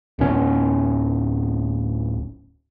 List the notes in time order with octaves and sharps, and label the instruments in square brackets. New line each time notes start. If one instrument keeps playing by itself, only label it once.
[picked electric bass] D1 C#4